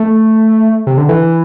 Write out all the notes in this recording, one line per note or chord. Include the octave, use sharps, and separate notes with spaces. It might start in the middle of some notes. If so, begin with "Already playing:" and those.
Already playing: A3
C3
D3
E3